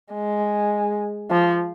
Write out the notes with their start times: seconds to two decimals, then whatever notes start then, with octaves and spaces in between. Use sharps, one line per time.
0.14 G#3
1.30 F3